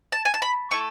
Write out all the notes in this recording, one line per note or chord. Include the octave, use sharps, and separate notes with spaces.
A5
G#5
A5
B5
A3 E4 A4 C#6